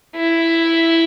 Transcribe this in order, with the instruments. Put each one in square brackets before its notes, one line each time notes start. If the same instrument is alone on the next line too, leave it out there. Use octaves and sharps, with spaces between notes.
[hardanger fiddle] E4